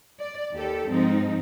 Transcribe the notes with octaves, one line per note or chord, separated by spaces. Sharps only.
D5
D#2 G4 A4
G#2 F3 C4 D#4